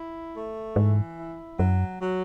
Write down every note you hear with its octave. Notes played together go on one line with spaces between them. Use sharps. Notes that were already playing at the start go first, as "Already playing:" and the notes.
Already playing: E4
A3
G#2 E3
E4
F#2 F#3
F#3